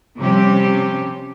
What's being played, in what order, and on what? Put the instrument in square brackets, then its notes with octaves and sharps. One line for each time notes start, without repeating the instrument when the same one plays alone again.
[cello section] C3 F3 G3 C#4 G4